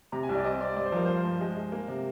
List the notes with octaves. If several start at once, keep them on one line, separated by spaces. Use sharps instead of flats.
C3 A#5
G#5
C2
D5
C4 D#5
C4 D5
G2 D5
C5
F3 A#4
G2 C5
G2
G#3
G#3
A#3
C3